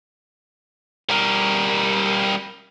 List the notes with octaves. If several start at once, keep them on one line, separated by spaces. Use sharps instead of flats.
G3 A#4